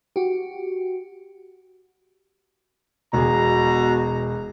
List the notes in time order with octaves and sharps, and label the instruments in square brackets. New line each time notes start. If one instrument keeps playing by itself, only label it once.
[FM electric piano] F#4 G4
[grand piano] E1 G#4 [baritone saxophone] B2 [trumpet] A#5